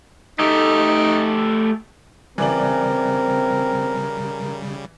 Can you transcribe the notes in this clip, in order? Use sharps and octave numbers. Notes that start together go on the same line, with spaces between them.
A3 D#4 G4
C#3 E3 G3 C4 A#4 D5 F#7